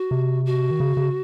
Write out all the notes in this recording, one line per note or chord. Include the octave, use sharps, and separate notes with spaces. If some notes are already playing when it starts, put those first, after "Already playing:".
Already playing: F#4
C3
F#4
D#3
C#3
C#3